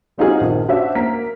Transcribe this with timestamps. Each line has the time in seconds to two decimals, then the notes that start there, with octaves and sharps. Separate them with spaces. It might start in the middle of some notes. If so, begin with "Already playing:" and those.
0.18 G3 C4 D#4 F4 F#4 G#4
0.41 A#1 D#3 F3
0.68 C#4 D4 F#4 C5 E5
0.95 A#3 A#4 B6